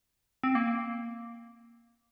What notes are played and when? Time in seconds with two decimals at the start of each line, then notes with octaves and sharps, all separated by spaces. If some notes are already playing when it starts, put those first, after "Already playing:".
0.44 C4
0.55 A#3